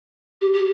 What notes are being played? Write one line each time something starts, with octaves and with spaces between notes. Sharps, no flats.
G4
G4